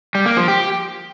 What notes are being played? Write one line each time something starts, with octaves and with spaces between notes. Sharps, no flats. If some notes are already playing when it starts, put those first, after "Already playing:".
G3
A#3
F3
G4